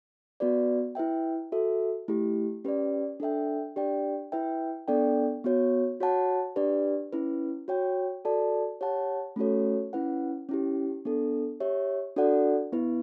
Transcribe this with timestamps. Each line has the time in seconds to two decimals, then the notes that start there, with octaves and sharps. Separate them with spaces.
0.40 B3 F#4 B4 D5
0.95 E4 B4 E5 G5
1.52 F#4 A4 E5
2.08 A3 E4 G4
2.65 C#4 G4 B4 D5
3.20 D4 A4 E5 G5
3.76 D4 G4 D5 G5
4.32 E4 B4 E5 G5
4.88 B3 D4 A4 D5 G5
5.44 B3 F#4 C#5
6.00 F#4 C#5 F#5 A5
6.56 D4 G4 B4 D5
7.13 C#4 E4 B4
7.68 F#4 C#5 G5
8.25 F#4 A4 D5 A5
8.81 G4 C#5 F#5 A5
9.36 A3 C#4 F#4 A4 C#5
9.93 C#4 E4 B4 F#5
10.49 C#4 E4 G4
11.05 B3 D4 A4
11.60 G4 C#5 E5
12.16 D4 F#4 A4 D5 F#5
12.73 B3 E4 B4